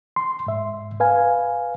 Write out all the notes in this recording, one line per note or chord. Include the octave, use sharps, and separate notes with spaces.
C6
G#2 E5
B4 F5 G#5